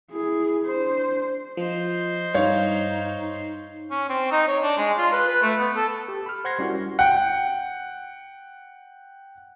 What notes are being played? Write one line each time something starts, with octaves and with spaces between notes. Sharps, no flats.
E4 G#4
D4 C5
F3 C5 D#5
G2 D#4 C#5 F5
C#4
C4
D#4
C#5
D4
G#3
F4
B4
B4
A3
B3
A4
G4
B5 F6
C5 F#5 C6 G#6 A#6 C7
G3 C#4 E4 F#4 A#4 F#5
F#5 G5